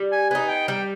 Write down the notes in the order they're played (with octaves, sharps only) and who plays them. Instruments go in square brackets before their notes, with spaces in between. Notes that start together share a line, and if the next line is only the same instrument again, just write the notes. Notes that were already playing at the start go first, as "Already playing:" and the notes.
Already playing: [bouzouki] G3
[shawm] G#5
[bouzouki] B3 D#4 [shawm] G#5
[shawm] G5
[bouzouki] G3 [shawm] G5